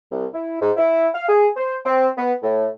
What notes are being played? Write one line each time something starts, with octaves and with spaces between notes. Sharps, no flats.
C2
E4
G#2
E4
F5
G#4
C5
C4
B3
A2